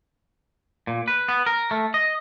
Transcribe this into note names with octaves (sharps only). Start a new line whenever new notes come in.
A#2
B4
B3
A#4
A3
D#5